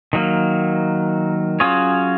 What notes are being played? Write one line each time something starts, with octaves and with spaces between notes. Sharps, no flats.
D#3 F#3 A#3
F#3 C#4 F4 G#4 C#5